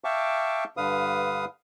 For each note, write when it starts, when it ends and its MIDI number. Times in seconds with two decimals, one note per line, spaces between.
0.04 0.64 76
0.04 0.64 77
0.04 0.64 79
0.04 0.64 81
0.04 0.64 85
0.04 0.64 86
0.77 1.45 43
0.77 1.45 50
0.77 1.45 71
0.77 1.45 77
0.77 1.45 87